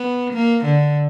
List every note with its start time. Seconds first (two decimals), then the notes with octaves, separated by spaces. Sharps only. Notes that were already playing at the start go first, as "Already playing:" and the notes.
Already playing: B3
0.33 A#3
0.65 D3